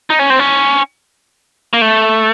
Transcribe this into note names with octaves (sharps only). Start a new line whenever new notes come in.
D#4
C#4
C4
C#4
A#3
A3